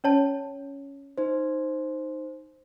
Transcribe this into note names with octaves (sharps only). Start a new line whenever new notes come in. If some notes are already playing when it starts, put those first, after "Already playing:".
C#4 C#5 A5
D#4 C5